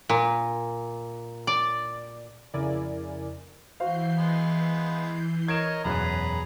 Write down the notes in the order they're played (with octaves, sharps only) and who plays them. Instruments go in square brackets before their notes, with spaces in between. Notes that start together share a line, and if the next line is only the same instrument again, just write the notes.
[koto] A#2
D5
[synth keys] F2 C#3 E4 A#4 D5 G#5
[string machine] E3 G6 C7 [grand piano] F#4 C5 F5
[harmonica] G#3 B3
[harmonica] A#4 C#5 D#5 [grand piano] G#6 D7 E7
[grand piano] E1 F#2 F#6 [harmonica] G#4 B4 A#5